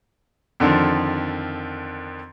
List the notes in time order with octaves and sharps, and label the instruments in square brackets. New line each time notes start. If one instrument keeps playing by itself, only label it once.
[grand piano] F2 D3 D#3 F3